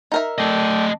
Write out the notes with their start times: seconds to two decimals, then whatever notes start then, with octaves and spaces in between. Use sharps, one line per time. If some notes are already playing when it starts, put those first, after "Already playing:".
0.12 D#4 A#4 E5
0.38 A3 A4 D5 D#5 G5